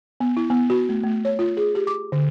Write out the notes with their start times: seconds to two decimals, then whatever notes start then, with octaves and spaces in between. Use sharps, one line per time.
0.20 B3
0.37 E4
0.50 B3
0.70 F#4
0.89 A3
1.04 A3
1.25 C#5
1.39 F4
1.57 G#4
1.75 G4
1.87 D6
2.12 D3